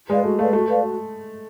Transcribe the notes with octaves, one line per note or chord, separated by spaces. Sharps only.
G#3 B4 D5 F5
A3 F#4
A3 B4 D5 F5
A3 F#4
B4 D5 F5
F#4